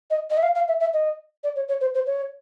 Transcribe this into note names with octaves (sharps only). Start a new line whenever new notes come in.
D#5
D#5
E5
F5
F5
E5
E5
D#5
D5
C#5
C#5
C5
C5
C#5